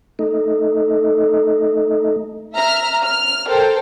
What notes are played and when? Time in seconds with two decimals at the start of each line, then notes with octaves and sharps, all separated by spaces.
0.19 A3 D#4
2.55 E5 A#5 F6
3.05 F6
3.47 A4 A#4 C5 G5